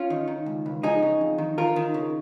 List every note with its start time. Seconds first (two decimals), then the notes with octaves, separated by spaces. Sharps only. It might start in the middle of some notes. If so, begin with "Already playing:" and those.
Already playing: C#4 F4
0.10 D#3
0.28 D#3
0.46 C#2
0.66 C#2
0.83 F3 D#4 G#4
1.02 C#3
1.21 F2
1.38 D#3
1.58 D#3 F4 A#4
1.76 D#3
1.94 C#3